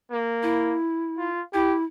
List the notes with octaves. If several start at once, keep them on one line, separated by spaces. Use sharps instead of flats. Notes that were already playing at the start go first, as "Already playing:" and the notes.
A#3
E4
F4
E4 G4